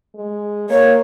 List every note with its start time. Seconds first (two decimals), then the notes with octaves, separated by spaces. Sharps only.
0.16 G#3
0.70 A#3 C#5